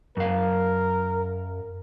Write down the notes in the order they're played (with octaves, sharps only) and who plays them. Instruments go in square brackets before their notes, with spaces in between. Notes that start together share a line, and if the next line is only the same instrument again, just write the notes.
[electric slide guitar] F#2 F5 [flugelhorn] A#4